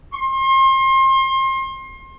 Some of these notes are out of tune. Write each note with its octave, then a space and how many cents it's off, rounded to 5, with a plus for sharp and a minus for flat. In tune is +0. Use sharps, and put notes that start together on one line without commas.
C6 +35